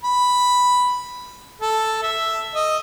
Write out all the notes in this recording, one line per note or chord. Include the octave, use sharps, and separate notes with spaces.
B5
A4
E5
D#5